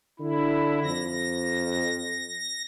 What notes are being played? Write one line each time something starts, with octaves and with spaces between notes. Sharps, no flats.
D3 E4
F2 A#6